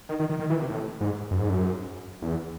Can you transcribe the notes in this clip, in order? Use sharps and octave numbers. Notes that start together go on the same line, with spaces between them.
D#3
D#3
D#3
D#3
E3
C3
A2
G#2
F#2
G#2
F#2
E2